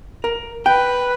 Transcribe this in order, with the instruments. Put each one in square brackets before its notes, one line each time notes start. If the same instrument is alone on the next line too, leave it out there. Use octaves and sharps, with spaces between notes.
[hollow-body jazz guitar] A#4
[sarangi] B4 [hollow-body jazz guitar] G5